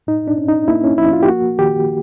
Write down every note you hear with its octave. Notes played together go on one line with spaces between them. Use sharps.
A2 D#4
D4
C#4
D#4
A#3 E4
C#4
F3 E4
F4
G4
A#3 F#4
D#3 G4